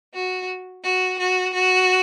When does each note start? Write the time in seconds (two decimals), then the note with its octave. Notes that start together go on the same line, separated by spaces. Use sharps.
0.14 F#4
0.83 F#4
1.18 F#4
1.53 F#4